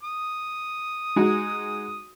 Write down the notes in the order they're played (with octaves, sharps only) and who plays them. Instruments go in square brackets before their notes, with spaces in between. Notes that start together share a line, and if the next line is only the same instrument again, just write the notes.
[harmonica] D#6
[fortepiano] G#3 D#4 F#4